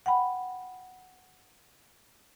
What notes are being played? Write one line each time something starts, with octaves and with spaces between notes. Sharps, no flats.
F#5 G5 B5